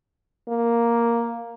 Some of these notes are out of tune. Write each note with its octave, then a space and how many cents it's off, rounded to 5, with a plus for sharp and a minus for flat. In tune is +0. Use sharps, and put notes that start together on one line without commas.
A#3 +0